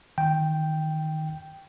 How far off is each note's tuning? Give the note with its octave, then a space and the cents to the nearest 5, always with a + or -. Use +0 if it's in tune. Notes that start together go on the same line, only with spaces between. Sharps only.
D#3 +0 G5 +0